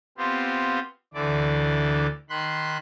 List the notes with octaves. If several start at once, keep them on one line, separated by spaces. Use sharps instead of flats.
B3 C4 F4 G4
D2 D3 E3 D5
D#3 B5 C6 F#6